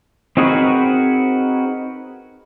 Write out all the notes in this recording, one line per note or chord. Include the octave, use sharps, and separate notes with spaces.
C4 D#4 F#4 G#4 A#4 B4